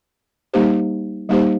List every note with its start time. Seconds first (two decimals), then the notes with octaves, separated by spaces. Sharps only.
0.54 G3 A#3 D#4 G4 C5
1.29 G3 A#3 D#4 G4 C5